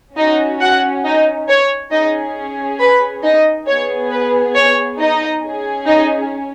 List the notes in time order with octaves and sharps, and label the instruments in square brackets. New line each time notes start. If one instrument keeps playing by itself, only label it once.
[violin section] C#4 D#4 F#4 D#5
F#4 F#5
D#4 D#5
C#5
C#4 D#4 G#4 D#5
B4 B5
D#4 D#5
B3 G#4 C#5
B4
C#5
D#4 D#5
C#4 G#4
D#4 D#5